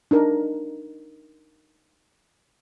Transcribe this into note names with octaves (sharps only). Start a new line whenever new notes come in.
D4 D#4 A#4